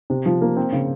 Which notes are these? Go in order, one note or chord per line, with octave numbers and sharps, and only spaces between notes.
C3
F3
A#3
C4
C#3